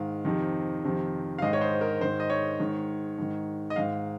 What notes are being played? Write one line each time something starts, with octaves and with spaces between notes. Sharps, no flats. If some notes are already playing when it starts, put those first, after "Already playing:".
Already playing: G#2 D#3 F5
F2 C3 D#3
F2 C3 D#3
F5
G#2 D#3 D#5
C#5
C5
A#4
G#2 D#3 C5
D#5
C#5
G#2 D#3
G#2 D#3
D#5
G#2 D#3 F5